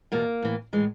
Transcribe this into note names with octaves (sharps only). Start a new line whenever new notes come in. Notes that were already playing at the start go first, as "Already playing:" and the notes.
E2 B2 A#3
A2 E3
A2 E3 G#3